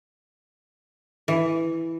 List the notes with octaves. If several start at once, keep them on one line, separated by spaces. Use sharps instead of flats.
E3